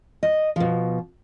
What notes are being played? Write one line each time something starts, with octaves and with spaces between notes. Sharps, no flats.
D#5
B2 F3